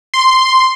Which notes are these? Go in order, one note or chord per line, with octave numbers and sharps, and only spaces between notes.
C6